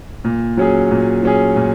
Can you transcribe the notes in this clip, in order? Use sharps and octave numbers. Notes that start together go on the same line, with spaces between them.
A#2
F#3 C#4 G#4
A#2
F#3 C#4 G#4
A#2